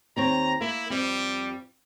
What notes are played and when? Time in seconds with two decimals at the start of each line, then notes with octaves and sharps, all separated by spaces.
0.16 D#2 C4 C#5 A#5
0.61 A#3 E4
0.90 F2 G3 C4